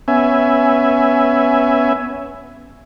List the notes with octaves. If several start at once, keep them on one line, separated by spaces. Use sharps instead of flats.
B3 C#4 E5 G#5